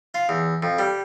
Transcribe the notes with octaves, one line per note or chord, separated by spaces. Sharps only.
F4
E2
F2
G3